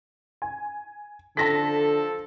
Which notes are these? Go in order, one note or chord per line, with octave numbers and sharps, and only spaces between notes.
G#5
D3 F3 A4 A5 A#6 B6